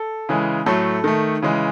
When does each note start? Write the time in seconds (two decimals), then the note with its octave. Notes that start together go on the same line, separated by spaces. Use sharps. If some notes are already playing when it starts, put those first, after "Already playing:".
Already playing: A4
0.29 C#3 E3 G#3
0.66 A2 F#3 A3 A4
1.04 D#3 A3
1.42 C#3 E3 G#3